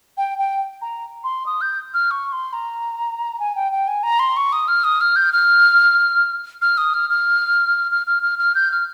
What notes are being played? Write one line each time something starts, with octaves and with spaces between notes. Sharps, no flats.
G5
G5
A#5
C6
D#6
G6
F6
C#6
C6
A#5
G#5
G5
G5
G#5
A#5
C6
C#6
D#6
F6
D#6
F6
G6
F6
F6
D#6
F6
F6
F6
F6
F6
F6
G6
F6